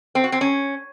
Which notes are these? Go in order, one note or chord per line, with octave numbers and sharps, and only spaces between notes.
C4
F#4
C4
C#4